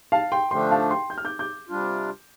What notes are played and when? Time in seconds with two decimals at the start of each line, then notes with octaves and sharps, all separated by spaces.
0.12 F5 A5
0.32 G5 C6
0.51 D3 F3 A3 D4 G5 C6
0.71 F5 A5
0.91 G5 C6
1.10 G6
1.18 F6
1.25 D6 G6
1.39 D6 G6
1.69 C3 G3 D4 F4